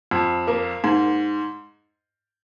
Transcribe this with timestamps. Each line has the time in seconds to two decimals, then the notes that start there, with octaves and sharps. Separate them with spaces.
0.11 F2
0.47 A#3
0.84 G#2